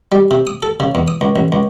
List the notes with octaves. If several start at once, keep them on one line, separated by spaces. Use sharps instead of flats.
G3
C3
D#6
A4
C#3
E2
D#6
C#2
A1
C#2